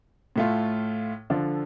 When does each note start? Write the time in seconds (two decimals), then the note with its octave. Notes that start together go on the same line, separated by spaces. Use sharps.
0.36 A2 A3 F4
1.30 D3 F3 D4 F4 A4